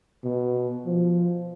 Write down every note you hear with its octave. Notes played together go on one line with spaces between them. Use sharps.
B2
F3